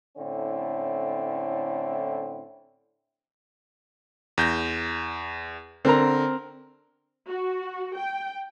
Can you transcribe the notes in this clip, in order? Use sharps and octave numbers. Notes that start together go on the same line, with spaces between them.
A2 D3 C4 C#4 E4
E2 G6 A#6
D3 C4 A#4 A#5
F#4
G5